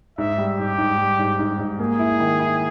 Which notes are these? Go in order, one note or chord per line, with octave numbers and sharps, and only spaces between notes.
G#2 E5
G3
G#2 G4
G#2
G3
G#2
G#2
G#2
A#3 G#4
E4
D#3
E4